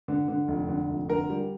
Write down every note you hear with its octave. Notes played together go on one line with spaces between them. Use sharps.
D3
D3
F1
D3
F1
D3 A#4
G3